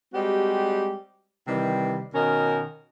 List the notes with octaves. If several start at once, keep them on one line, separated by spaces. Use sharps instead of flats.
G3 G#3 C4 F#4 G4
C3 D#3 E3 G3
B2 D#3 C#4 A#4